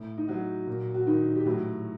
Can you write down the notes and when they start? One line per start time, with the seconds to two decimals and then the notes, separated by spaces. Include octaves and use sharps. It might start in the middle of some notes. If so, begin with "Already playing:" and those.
Already playing: A2
0.17 D#4
0.28 F#3 F#4
0.67 A#2
0.94 F#4
1.07 D#3 D#4
1.35 G4
1.46 A2 F#3 F#4